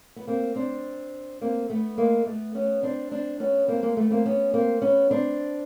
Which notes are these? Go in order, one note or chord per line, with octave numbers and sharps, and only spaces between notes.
B3
A#3 C4
C4 D4
A#3 C4
A3 B3
G#3 A#3
A3 B3
B3 C#4
C4 D4
C4 D4
B3 C#4
A#3 C4
G#3 A#3
A3 B3
A#3 C4
B3 C#4
A#3 C4
B3 C#4
C4 D4